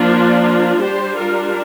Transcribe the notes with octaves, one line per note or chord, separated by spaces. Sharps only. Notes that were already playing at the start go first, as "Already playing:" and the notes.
Already playing: F3 A#3 D4 F4
G3 D4 G4 C5
F4 A#4